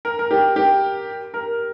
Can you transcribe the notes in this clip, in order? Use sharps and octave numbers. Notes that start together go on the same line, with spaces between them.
A#4
A#4
G4
G4
A#4